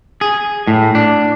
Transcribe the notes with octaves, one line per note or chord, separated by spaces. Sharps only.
G#4
A2
D4